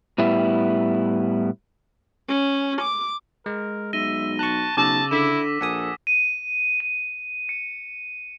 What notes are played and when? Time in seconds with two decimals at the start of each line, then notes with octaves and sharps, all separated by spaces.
0.18 A2 G3 B3 E4
2.28 C#4
2.81 D6
3.46 G#3 A#4
3.93 B1 E5 A#6 D#7 G7
4.39 A5 C#6 F#6
4.77 B1 C#3 A5 D6 E6 A#6
5.11 D3 E4 B6 E7
5.61 A#1 A4 F#5 G#5 D#6
6.07 D#7
6.80 D#7
7.49 C#7